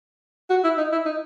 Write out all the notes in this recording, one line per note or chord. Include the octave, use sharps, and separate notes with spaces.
F#4
E4
D#4
E4
D#4